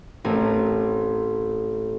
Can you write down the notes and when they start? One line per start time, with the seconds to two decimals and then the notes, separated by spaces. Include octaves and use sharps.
0.25 A1 C4 A#4 D#7